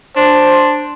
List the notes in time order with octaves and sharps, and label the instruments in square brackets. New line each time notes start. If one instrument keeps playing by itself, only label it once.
[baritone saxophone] D4 [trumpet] C5